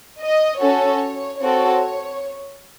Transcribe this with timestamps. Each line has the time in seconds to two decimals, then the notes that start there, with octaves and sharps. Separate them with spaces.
0.21 D#5
0.61 C#4 F#4 A4 C#5
1.41 C4 F#4 A4 C#5